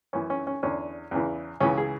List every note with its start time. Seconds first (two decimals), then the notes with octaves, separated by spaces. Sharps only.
0.13 F#2 E3 C#4
0.30 C#4
0.47 C#4
0.63 E2 D3 C#4
1.11 E2 C#3 E3
1.60 C#2 C#3 E3 C#4
1.77 G#4